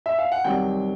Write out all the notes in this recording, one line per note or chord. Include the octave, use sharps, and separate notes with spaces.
E5
F5
F#5
C2 C3 D#3 F#3 G5